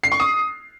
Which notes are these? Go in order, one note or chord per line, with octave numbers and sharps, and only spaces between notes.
C7
C#6
D#6